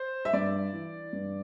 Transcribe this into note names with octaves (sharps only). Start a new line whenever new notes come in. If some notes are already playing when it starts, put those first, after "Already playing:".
Already playing: C5
E5
G2 D5
E3
G2